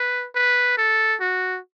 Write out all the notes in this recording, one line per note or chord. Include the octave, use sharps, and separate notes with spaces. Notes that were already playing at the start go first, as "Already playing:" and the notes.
Already playing: B4
B4
A4
F#4